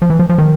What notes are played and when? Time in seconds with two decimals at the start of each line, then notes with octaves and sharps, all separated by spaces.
0.02 F3
0.10 E3
0.19 F3
0.29 F3
0.38 D#3